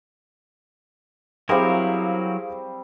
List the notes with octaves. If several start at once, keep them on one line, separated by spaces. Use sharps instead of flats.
F#3 G3 C4 E4 G#4 A#4 C5 F5